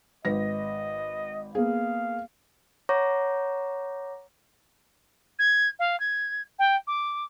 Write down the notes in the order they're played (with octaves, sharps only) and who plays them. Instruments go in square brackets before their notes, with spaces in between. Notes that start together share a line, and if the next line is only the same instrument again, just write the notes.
[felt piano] G#1 B4 A#6 [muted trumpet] D#5
[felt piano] A#3 B3 G#4 [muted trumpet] F5
[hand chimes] C#5 F#5 A#5 C#6 D6 A#6
[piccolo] G#6
F5
G#6
G5
D6